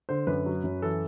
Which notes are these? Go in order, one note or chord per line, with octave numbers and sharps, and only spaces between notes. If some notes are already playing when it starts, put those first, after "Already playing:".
D3 C5
F#2 B4
F#3
F#2
E3 A4